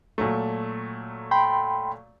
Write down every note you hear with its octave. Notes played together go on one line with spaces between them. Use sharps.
A#2 F#3 A3
G5 B5 C6